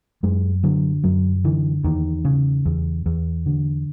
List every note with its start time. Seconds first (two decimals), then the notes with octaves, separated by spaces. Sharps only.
0.23 F#2 G#3
0.63 D3 F#3
1.04 F#2 F#3
1.44 D3 E3
1.84 E2 D#3
2.25 C#3
2.66 E2
3.06 E2
3.46 D3